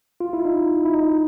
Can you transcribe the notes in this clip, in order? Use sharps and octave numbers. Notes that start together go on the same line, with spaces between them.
F4
E4
D#4
E4
D#4